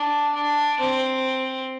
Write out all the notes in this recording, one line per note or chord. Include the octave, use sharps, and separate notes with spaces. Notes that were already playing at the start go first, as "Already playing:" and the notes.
Already playing: D4
D4
C4